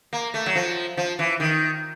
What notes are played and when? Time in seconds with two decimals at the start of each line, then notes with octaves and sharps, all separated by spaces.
0.13 A#3
0.34 A3
0.46 F#3
0.55 F3
0.97 F3
1.19 E3
1.40 D#3